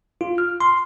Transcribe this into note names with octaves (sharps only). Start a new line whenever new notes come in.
F4
F6
C6